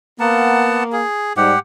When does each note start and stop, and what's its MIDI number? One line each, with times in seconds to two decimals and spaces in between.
0.20 1.02 58
0.20 0.84 59
0.20 0.84 78
0.20 0.84 81
0.92 1.33 68
1.37 1.53 44
1.37 1.53 55
1.37 1.59 67
1.37 1.59 78